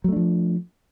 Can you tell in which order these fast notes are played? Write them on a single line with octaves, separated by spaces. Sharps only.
F#3 A3 D4 F3